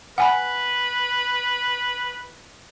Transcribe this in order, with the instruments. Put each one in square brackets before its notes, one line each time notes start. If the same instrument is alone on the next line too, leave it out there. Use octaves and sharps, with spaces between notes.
[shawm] B4 [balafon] F#5 G#5 B5